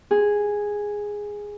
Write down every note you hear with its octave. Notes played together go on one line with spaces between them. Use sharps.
G#4